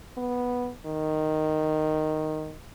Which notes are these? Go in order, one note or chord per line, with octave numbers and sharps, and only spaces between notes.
B3
D#3